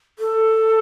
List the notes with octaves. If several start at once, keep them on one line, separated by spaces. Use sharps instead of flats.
A4